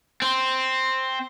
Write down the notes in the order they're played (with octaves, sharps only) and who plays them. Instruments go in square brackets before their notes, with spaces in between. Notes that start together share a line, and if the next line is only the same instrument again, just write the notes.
[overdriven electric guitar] C4